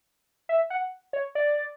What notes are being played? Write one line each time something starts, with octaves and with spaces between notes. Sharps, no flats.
E5
F#5
C#5
D5